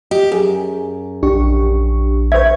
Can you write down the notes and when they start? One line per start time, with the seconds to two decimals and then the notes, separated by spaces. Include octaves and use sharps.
0.11 G4 D#5
0.32 F#2 G#4
1.23 A#1 D4 G4 C#6
2.32 B4 C5 E5 C#6 G#6